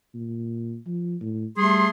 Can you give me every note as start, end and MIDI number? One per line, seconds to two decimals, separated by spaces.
0.15 0.77 46
0.87 1.16 53
1.22 1.46 45
1.57 1.88 55
1.57 1.90 57
1.57 1.90 68
1.57 1.90 84